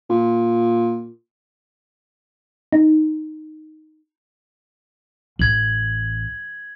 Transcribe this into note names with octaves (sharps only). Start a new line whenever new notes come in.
A#2
D#4
A1 G#6 F#7